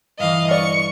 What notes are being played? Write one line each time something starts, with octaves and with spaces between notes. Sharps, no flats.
G1 E3 D#5 F5
D5 C#6